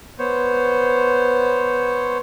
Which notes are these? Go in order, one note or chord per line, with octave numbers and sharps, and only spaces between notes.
B3 C5 C#5